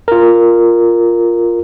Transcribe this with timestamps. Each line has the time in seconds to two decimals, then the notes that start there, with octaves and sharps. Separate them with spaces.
0.08 F4 A#4